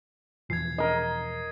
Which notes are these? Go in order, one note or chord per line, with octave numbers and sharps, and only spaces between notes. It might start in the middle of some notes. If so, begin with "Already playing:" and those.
E1 E3 F3 G#6 C7
A#4 D#5